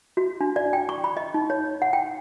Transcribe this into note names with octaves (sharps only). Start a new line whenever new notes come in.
F#4
D4
D5
G5
C#6
B5
D#5
D#4
C#5
F#5
G5